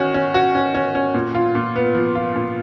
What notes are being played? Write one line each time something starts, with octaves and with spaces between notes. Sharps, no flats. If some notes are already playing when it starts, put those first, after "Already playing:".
Already playing: D#3 C#4 F#4
C#4
F#4
C#4
C#4
C#4
A#2
F4
A#2
B3
F3
F4
A#2